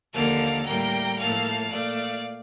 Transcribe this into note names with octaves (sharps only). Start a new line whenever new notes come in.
D#2 D3 F3 A#3 F5 A5
A2 G3 A#3 G5 A#5
A2 F3 A#3 F5 A5
A#2 A3 D5 F5